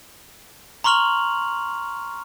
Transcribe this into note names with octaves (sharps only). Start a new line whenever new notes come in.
A#5 C6 C#6 F6 F7 F#7